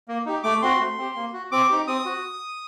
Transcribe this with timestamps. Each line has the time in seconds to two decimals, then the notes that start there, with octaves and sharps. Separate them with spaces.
0.08 A#3
0.26 D#4 G4
0.43 A3 D6
0.62 C4 F#4 C6
0.80 A3
0.98 C4 G4
1.16 A#3
1.33 F#4
1.51 C4 D6
1.70 D#4 G4
1.87 C4 D#6
2.06 F#4